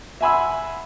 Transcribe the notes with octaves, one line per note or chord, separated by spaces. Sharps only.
E5 F#5 G#5 B5 C6 E6